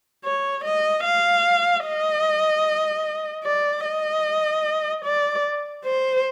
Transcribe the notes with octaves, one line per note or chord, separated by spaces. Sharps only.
C#5
D#5
F5
D#5
D5
D#5
D5
C5